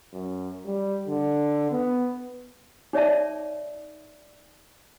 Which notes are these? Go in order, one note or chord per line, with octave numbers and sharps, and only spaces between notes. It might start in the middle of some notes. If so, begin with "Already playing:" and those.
F#2
G3
D3
B3
D#4 C#5 D5 E5 A5